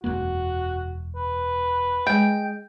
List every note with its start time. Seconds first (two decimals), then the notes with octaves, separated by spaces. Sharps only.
0.04 E1 F#2 A#3 F#4
1.16 B4
2.07 G#3 D#5 G5